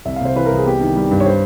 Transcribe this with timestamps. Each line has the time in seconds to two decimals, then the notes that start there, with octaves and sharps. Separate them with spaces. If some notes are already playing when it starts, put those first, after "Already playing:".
0.05 C2 E5
0.16 F5
0.21 C3 C5
0.35 E3 B4
0.46 A#4
0.51 C2 G#4
0.66 B3 G4
0.81 D#3
0.96 G3
1.11 G2
1.20 C#5
1.26 C5